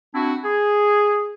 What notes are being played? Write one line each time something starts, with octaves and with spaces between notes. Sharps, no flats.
C4 D4 E4 F#4
G#4